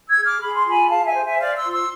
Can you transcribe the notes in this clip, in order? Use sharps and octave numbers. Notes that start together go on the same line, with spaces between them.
E6 G#6
G#4
D6 F6
G#4 B5
C6
F4 G#5 B5
G#4 F5 A5
E5 G#5
C5
E5 G#5
C5 D5 F5
C6 E6
F4
C6 E6